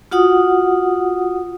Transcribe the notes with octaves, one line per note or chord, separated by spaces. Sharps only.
F4 F#4 F#5 D#6